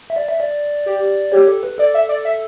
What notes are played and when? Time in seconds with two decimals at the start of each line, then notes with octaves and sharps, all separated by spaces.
0.10 E5
0.16 D5
0.28 E5
0.40 D5
0.86 G4
1.32 G4 C#5
1.48 A4
1.63 B4
1.78 A4 D5
1.94 E5
2.09 D5
2.25 E5